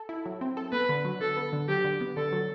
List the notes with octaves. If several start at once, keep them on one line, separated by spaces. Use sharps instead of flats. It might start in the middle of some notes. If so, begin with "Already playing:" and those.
Already playing: A4
E4
F#3
C4
A4
B3 B4
D3
F#3
D3 A4
B3
D3
F#3 G4
D3
B3
D3 A4
F#3